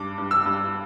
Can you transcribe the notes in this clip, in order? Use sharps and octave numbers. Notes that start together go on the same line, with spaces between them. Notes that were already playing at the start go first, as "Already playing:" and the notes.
Already playing: G2 D6
G2
E6
G2